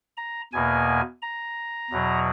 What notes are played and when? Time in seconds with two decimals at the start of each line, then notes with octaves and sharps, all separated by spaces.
0.17 A#5
0.53 E2 B2 A#3 G#5
1.22 A#5
1.91 E2 B2 F#3